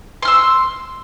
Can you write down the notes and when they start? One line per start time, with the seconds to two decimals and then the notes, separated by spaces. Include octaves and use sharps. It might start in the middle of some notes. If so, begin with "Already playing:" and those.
0.22 C6
0.25 F6
0.28 E6